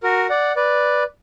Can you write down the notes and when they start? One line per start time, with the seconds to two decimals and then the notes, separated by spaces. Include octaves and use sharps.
0.03 F#4 A#4
0.30 D5 F#5
0.56 B4 D5